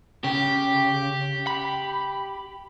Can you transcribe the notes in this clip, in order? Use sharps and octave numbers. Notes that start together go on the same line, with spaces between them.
C#3 G4
B5